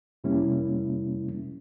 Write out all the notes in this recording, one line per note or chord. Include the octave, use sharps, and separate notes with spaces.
F2 C3 G3 A#3 C#4 E4